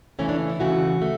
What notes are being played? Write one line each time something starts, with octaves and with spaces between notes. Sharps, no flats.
C#3 E3 A3 C#4
D4
C#4
E4
C#3 E3 A3 F#4
A3